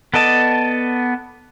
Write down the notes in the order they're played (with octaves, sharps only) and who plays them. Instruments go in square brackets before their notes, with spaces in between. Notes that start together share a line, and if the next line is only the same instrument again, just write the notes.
[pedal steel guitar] B3 A4 D5 D#5 A5